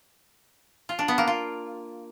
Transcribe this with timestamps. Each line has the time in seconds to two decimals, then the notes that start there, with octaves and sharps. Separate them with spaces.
0.89 F4
0.99 D4
1.08 B3
1.18 A#3
1.27 F4